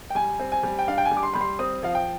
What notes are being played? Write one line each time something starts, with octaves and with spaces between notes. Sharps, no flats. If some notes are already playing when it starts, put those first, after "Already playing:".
G5
G3 G#5
C4
G#5
G3
G5
D4 F5
G5
G#5
G3
D6
C6
G3 B5
C6
C4 D#6
F3 F5
G5